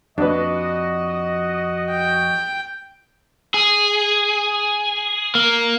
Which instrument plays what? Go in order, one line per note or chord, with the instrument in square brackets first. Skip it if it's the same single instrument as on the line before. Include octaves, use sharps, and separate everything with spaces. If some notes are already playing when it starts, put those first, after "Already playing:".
[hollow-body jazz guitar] F2 [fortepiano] D4 B4 [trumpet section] F#4 D#5
[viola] G5
[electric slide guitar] G#4
A#3